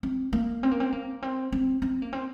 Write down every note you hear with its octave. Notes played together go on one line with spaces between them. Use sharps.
C4
A#3
C4
A#3
C4
A#3
C4
C4
C4
A#3
C4